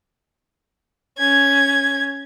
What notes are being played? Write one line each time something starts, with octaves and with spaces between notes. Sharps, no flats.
C#4 G#6